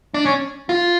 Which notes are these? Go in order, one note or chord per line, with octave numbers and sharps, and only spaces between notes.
D4
C#4
F4